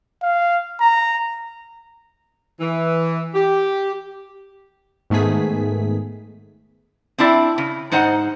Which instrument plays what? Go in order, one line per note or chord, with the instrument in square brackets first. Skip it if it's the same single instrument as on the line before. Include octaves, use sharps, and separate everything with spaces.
[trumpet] F5
A#5
[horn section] E3
G4
[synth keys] G#2 D#3 A3 B3 G#4 B6
[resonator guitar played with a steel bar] C4 D4 E4 D5
C#3
G#2 D#4 C5 D#5 F#5